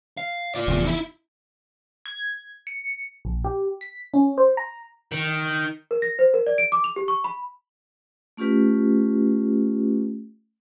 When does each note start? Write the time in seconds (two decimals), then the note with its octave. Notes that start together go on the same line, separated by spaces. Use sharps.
0.17 F5
0.55 F4 D5
0.68 F1 E2
0.85 D#4 E4
2.06 G#6
2.67 C#7
3.25 A#1
3.44 G4
3.81 B6
4.14 C#4
4.38 C5
4.57 A#5
5.12 D#3
5.91 A#4
6.02 A#6
6.19 C5
6.34 A#4
6.47 D5
6.58 D7
6.72 D6
6.84 F7
6.96 G4
7.08 C#6
7.24 B5
8.37 A3 C#4 F4 G4 B4